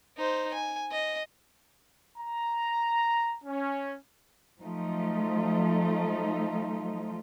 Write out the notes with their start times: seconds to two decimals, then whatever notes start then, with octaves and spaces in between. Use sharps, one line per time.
0.18 D#4 C5
0.54 G#5
0.92 D#5
2.19 A#5
3.44 C#4
4.60 F3 F#3 A3 D#4 F4